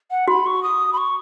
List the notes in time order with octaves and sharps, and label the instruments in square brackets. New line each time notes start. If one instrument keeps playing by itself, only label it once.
[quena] F#5
[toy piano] F#4 [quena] B5
[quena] C#6
D#6
B5
C#6